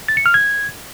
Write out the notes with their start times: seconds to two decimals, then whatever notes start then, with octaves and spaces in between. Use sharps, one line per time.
0.08 A6
0.17 C#7
0.26 F6
0.34 G#6